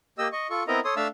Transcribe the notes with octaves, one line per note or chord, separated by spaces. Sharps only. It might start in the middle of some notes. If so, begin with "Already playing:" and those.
A#3 G4 D#5 E6
D#5 C#6
F4 A4 C#6
B3 C4 E4 A#4 D#5 A#5
A4 C#5 C6 D#6
A3 D4 E5 F5 A5 E6